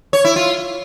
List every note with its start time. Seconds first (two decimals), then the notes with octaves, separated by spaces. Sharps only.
0.13 C#5
0.25 E4
0.36 F4